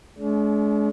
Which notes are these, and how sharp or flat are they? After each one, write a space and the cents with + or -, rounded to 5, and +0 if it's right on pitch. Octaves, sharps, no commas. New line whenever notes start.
G#3 +40 D4 -45